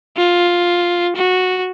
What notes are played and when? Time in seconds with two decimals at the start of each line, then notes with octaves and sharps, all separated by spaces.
0.17 F4
1.16 F#4